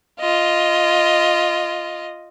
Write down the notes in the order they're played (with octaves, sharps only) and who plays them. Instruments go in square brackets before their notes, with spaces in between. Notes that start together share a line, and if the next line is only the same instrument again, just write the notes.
[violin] F4 D#5